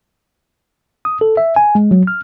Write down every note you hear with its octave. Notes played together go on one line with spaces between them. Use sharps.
D#6
A4
E5
G#5
G#3
F#3
F6